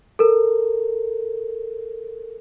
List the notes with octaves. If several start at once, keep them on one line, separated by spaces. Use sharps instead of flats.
A4 A#4